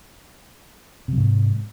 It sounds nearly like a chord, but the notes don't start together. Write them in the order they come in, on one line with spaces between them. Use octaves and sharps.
C3 F#3 G#2